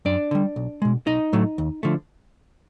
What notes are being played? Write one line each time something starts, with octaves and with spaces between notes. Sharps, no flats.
F#2 D4 D5
D3 G3
B1
B2 G#3
B1 D#4 D#5
A2 F#3 A3
D#2
D3 F3 A3